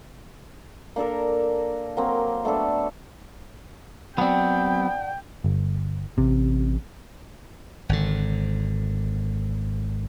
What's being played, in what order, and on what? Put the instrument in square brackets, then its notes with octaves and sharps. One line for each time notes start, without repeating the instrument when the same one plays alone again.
[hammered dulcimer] A#3 D4 A4 A#4
F#3 A#3 C4
A3 B3 D4 A4
[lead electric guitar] F#3 [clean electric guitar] B3 C4 [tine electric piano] D5 F#5 A5 [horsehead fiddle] G5
[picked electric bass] G1
[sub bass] A1 [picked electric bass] C3
[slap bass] G#1 D3